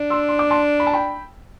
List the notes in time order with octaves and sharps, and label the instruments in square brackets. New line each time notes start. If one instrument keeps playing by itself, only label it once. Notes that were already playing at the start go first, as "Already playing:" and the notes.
Already playing: [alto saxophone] D4
[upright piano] C6 E6
C6
D6
A5 C6
B5
A5
G5 B5